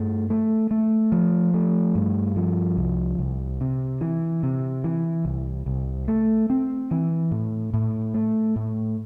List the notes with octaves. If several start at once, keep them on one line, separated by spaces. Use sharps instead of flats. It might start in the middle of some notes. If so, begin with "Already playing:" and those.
Already playing: G2 A3
A3
A3
F3
A3
G2
F3
C2
C2
C3
E3
C3
E3
C2
C2
A3
C4
E3
A2
A2
A3
A2